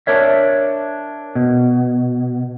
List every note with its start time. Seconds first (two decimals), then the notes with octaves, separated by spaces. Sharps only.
0.07 D4 A#4 C#5 E5
1.35 B2